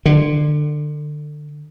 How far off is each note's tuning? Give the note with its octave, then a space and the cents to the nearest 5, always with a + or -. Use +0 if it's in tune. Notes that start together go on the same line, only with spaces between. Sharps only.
D3 +25